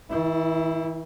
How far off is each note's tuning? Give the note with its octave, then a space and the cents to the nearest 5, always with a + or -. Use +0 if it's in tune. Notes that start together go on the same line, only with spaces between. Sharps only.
E3 -45 E4 +10